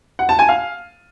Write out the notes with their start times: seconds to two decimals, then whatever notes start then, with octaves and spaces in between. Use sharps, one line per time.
0.19 F#5
0.29 A5
0.39 G#5
0.49 F5